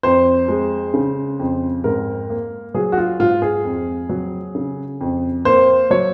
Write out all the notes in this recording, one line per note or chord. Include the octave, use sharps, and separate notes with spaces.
F2 C5
G#3
C#3
F2
G#2 A#4
A#3
F#3 G#4
F#4
F4
G#2 F4
G#4
F2
F#3
C#3
F2
A#3 C5
F#3 C#5